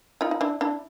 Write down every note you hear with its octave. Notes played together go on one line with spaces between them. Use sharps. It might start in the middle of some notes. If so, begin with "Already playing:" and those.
D#4 F4
D#4
D4 E4
D4 E4